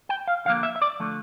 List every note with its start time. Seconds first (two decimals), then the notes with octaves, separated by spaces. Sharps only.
0.09 G5
0.28 F5
0.45 D3 F3 A#3 F5
0.63 E5
0.76 E5
0.82 D5
1.00 D3 F3 A3